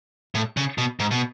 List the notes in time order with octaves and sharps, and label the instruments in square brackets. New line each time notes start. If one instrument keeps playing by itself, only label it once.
[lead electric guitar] A2
C#3
B2
G#2
B2